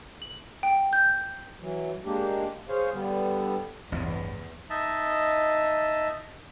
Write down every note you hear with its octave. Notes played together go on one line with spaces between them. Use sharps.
F#7
G5
G6
E3 F#3
G#3 A#3 D4 G4
G#4 C5 C#5 F5
D3 G3 B3
A1 E2 G2 C3
D#4 D#5 E5 A5